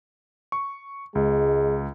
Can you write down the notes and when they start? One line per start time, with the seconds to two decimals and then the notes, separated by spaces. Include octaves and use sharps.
0.52 C#6
1.15 C#2 G#3